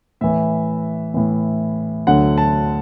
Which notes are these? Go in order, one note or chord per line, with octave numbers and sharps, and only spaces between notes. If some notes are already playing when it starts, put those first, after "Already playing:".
A2 E3 E5
A2 E3
D2 D3 F#3 F#5
A5